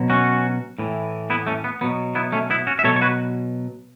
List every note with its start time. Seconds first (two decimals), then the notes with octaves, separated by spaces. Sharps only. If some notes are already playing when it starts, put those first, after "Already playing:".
Already playing: B2 F#3
0.10 C#4 F#4
0.79 A2 E3
1.30 B3 E4
1.47 A3 C#4
1.64 B3
1.81 B2 F#3 B3
2.15 B3 E4
2.32 A3 C#4
2.50 B3 E4
2.67 C#4 F#4
2.79 E5
2.84 B2 F#3 A4 C#5
2.96 C#5
3.01 F#4 B4